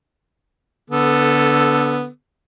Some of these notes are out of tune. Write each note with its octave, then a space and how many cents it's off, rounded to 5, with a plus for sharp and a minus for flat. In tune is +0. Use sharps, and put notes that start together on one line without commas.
D3 -20 B3 +0 A4 +0